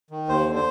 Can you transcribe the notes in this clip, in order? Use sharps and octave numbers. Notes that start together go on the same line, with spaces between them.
D#3
D#2 C5
D3
C5